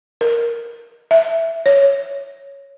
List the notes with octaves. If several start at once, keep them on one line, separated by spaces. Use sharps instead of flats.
A#4
E5
C#5